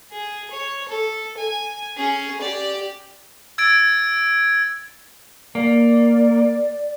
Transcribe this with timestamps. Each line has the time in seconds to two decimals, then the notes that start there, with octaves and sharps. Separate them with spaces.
0.12 G#4
0.51 C#5
0.89 A4
1.38 G#5
1.97 C#4 G#4
2.41 G4 D5
3.58 E6 G#6 A6 D7
5.55 A#3 D5